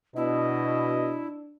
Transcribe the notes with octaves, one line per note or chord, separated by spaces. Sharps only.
B2 D4 E4 D#5